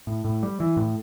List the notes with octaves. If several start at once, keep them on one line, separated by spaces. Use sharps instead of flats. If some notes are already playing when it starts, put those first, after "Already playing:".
A2
A2
G3
E3
A2